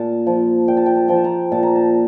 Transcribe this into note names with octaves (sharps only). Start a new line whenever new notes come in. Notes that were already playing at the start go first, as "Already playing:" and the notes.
Already playing: A#2 A5
F3
A#2 G5
A5
G5
A5
F3 G5
A5
A#5
A#2 A5
A#5
A5